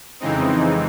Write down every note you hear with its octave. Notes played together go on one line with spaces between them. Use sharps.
F2 C#3 E3 G#3 C4 D#4